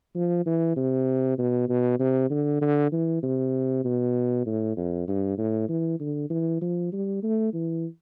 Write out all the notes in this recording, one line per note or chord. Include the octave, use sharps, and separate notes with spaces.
F3
E3
C3
B2
B2
C3
D3
D3
E3
C3
B2
A2
F2
G2
A2
E3
D3
E3
F3
G3
A3
E3